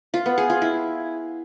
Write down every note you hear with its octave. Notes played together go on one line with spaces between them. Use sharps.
F4
B3
G#4
F4
E4